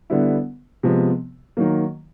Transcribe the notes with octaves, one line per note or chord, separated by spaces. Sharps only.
D3 G3 B3 E4
C3 F3 G#3 B3
D#3 F#3 A#3